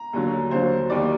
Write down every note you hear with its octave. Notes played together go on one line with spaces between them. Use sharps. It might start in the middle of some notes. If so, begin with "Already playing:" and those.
Already playing: A#5
D#2 D3 F#3
D#2 D3 F#3 C5
D#2 D#3 G3 D5